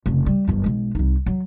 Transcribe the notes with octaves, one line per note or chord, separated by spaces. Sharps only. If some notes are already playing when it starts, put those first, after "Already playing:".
F1 C#3
G3
G1 F#2
B1 G#3
C2 D#4
F#3